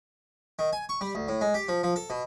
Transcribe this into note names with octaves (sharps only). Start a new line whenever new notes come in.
D#3
G#5
C#6
G3
D2
A2
G#3
G4
F3
F3
A4
B2